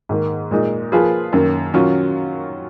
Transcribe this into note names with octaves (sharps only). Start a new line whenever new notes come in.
G#2 D#3 A#3
A#2 G#3 D#4
F3 A#3 F4 G#4 B4
F#2 D#3 A#3
D#3 F#3 C#4 F4